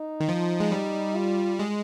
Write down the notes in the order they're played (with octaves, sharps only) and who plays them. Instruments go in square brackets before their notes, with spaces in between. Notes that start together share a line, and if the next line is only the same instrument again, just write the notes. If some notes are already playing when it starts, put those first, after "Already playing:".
Already playing: [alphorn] D#4
[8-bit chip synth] D#3
F3
G#3
G3
[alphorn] F4
[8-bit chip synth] G#3